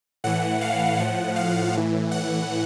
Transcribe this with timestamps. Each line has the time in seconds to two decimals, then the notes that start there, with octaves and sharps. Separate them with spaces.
0.24 A2 E3 F#5
0.61 F5
0.98 A2 F3 F#5
1.36 F5
1.74 A2 E3
2.11 F#5